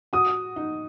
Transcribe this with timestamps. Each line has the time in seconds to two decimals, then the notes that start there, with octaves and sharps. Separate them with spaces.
0.13 F#4 D#6
0.56 D#4